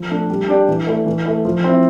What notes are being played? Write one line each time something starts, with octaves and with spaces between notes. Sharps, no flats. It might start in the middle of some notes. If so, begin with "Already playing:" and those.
Already playing: F3
A3 D4
G3
D4 G4 D5
E3
A3 E4
E3
A3 E4
F3
C4
E4